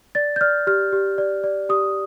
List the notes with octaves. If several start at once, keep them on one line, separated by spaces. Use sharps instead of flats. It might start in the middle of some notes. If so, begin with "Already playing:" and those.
D5 A6
G6
D5 F6
G4 F6
G4
D5
D5
G4 D#6